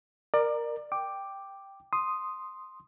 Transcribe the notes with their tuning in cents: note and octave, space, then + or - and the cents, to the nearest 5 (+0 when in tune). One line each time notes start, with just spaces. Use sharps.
A#4 +0 D5 +25
G5 +0 D6 +5
C6 +0 D#6 +0